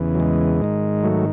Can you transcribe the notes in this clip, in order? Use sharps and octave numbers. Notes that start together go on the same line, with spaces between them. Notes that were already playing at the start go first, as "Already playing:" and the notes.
Already playing: E2 C#3 E3
F#3
G#3
G#2 D#3
F#3 A3